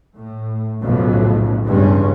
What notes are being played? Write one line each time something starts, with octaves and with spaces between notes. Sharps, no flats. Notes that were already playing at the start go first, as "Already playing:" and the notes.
A2
B1 F2 A2 C#3
E2 G2 C#3 G#3 C#4